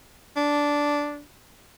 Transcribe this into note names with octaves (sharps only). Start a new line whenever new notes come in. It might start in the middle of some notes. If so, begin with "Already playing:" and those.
D4